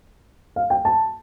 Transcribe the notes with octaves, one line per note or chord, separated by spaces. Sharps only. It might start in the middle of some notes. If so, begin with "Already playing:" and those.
F5
G5
A5